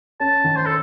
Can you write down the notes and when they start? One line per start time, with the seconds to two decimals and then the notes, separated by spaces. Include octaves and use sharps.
0.20 C#4 A5
0.44 D#3
0.56 C5
0.66 A4